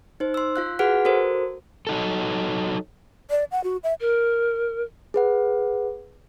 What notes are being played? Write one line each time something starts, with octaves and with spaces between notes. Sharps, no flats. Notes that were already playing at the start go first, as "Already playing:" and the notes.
D#4 C5
C6 E6
F4 F5 F#6
F#4 G#4 B4 F#5 F6 B6
F#4 A4 A#4 C5
F#3 D#4 A4
D5
F#5
F#4
E5
A#4
G#4 B4 F#5